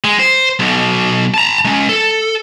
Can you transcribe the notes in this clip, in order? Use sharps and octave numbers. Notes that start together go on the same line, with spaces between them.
G#3
C5
B1 B2
A5 A#5
G#3 C#4
A4